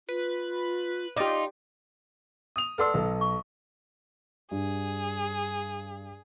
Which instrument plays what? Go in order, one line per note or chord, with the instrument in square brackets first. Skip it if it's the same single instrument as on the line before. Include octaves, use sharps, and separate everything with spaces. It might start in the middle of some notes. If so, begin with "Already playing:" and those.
[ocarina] F4 [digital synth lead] B4
[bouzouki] D#4 F4 [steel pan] G4 D5
[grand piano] D#6 F7
[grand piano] A4 D5 C6 [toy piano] B4 F#5 E6
[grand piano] B1 A4
[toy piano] C#6
[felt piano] G2 [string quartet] G#4